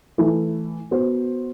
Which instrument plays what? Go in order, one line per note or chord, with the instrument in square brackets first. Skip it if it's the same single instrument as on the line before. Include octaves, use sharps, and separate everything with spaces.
[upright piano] E3 A3 E4
B3 F#4 C5